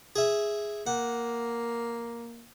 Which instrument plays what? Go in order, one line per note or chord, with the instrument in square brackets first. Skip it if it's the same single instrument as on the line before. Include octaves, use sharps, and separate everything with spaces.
[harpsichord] G#4 E5
[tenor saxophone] A#3 [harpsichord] F#5